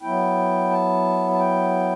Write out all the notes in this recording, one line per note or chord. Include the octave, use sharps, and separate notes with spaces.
F#3 B3 E4 G5
A5
A5
G5